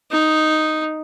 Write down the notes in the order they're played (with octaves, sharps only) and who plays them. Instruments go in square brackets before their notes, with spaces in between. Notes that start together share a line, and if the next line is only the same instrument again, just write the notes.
[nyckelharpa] D#4